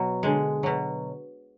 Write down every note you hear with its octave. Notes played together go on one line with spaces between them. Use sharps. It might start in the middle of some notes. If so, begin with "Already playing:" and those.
Already playing: B2 F#3
D3 G#3
B2 F#3